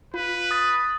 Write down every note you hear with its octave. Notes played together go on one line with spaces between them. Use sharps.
F4 B4
D#6 A6